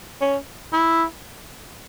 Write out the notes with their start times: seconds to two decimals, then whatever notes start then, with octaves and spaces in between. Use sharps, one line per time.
0.21 C#4
0.73 E4